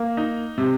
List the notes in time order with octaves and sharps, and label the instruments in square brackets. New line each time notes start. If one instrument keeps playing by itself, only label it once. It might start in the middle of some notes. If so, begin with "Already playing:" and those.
Already playing: [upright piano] A#3
D#4
C3